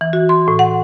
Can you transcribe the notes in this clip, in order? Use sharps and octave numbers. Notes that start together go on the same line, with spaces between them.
E3
F#4
C6
A2
F#5